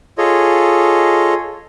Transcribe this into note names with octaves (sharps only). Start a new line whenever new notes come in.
F4 G#4 A4 C#5 D#5